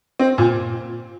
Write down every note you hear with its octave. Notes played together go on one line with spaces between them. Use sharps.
C4
A#2